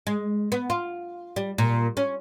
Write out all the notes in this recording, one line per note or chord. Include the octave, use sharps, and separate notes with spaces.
G#3
B3
F4
G3
A#2
C#4